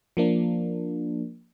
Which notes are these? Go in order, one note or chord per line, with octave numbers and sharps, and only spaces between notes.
F3 A#3 D4